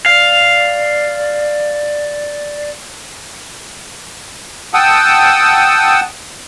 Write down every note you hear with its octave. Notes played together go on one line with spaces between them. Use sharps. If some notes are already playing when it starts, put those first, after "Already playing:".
D5 F5
F#5 G5 A5 D#6 E6